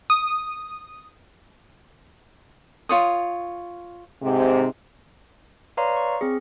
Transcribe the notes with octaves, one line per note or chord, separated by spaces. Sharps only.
D#6
F4 C#5 D#6
G#2 C3
B4 C#5 D5 F5 A#5 C6
C#6
C4 G#4